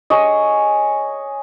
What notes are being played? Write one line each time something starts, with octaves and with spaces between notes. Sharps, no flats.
G#4 C#5 D#5